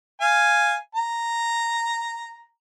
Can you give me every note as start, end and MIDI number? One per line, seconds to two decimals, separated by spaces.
0.21 0.76 77
0.21 0.76 80
0.95 2.47 82